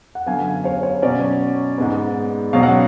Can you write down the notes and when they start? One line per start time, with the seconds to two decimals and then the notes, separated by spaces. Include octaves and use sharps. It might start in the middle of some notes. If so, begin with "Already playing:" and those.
0.15 F#5
0.26 F#2 D3 F#3 B3 F5 G#5
0.64 C#5 F5
0.83 C#5
1.02 B2 F#3 C#4 D5
1.78 G#2 G#3 B3
2.53 B2 F#3 C#4 F5
2.63 F#5